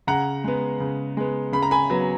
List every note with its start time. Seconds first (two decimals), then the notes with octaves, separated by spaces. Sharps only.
0.07 C#3 F#5 A#5
0.44 G#3 B3
0.80 C#3
1.17 G#3 B3
1.53 C#3 B5
1.62 A#5
1.71 G#5 B5
1.90 F#3 B3